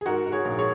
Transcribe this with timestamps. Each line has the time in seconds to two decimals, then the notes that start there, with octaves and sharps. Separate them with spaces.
0.01 G#4
0.06 G#2 F#4 A#4
0.26 G#2
0.32 G#4 C#5
0.45 A#1
0.59 G#4 C#5